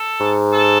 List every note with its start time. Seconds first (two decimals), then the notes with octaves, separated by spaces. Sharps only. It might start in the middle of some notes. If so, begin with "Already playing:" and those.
Already playing: A4
0.20 G#2
0.53 A4